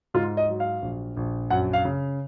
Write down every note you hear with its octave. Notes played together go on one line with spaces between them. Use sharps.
G#2 F4
D#5
F#3
F5
A#1
A#1
F#2 F#5
F5
C#3